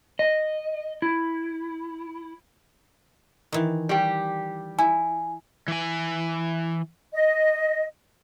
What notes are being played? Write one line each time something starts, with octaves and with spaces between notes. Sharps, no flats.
D#5
E4
D#3 E3
G3 G4
E4 G#5
E3 G#5
D#5